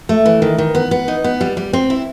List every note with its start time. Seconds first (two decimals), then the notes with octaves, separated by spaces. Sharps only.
0.09 A3
0.26 E3
0.42 D#3
0.58 D#3
0.75 B3
0.91 B3
1.08 D#4
1.24 B3
1.41 G3
1.57 G3
1.73 C4
1.90 E4